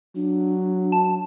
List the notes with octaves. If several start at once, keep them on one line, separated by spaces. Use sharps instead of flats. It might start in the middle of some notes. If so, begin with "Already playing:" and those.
F#3 D4
A5